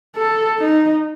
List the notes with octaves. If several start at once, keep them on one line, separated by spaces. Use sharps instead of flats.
A4
D#4